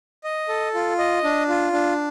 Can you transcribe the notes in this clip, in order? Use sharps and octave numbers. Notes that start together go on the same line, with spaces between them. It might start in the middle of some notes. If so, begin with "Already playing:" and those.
D#5
A4
F4
D#5
D4
F4
D4